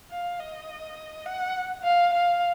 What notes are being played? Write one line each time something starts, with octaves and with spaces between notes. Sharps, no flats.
F5
D#5
F#5
F5
F5